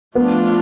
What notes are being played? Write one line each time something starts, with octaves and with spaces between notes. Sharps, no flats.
F3 A3 B3 D4 F4